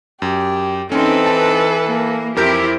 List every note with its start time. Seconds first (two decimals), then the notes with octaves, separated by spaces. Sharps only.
0.22 F#2 G4
0.92 E3 C4 C#4 D#4 A4 B4
1.26 A5
1.87 A#3
2.36 F2 C4 E4 G4 A#4 G6